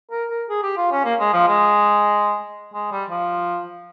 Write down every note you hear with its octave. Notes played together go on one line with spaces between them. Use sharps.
A#4
A#4
G#4
G4
F4
C#4
A#3
G#3
F3
G#3
G#3
G3
F3